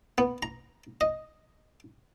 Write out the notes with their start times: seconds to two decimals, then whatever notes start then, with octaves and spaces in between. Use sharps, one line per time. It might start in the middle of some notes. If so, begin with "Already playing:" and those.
0.18 B3
0.43 A#5
1.01 D#5